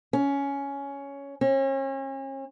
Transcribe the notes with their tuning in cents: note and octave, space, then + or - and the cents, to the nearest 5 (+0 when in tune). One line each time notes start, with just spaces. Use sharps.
C#4 +10
C#4 -40